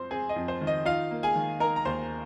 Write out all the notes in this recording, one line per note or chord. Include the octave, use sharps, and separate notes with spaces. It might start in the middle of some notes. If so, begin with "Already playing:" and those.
Already playing: F2 C4 C5 C6
C4 G#4 G#5
D#5
F2
C5
D#3
D#5
D#4 F4 F5
A#3
G#4 G#5
D#3
D#4 A#4 A#5
A#5
D#2 C5 C6